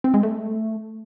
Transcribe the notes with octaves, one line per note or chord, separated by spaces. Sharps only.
C4
G#3
A3